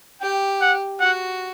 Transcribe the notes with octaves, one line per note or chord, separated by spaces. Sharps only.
G4 G5
F#5
F#4 F#5